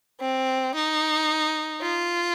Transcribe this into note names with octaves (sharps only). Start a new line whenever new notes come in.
C4
D#4
F4